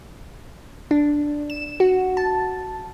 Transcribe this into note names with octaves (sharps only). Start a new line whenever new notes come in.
D4
E7
F#4
A5